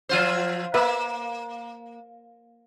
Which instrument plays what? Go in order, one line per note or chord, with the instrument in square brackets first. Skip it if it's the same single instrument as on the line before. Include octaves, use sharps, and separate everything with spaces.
[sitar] F3 F4 C5
[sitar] A#3 [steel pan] B4 E5